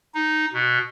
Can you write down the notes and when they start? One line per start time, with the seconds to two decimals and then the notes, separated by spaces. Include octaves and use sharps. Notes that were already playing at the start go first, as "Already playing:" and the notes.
0.15 D#4
0.53 B2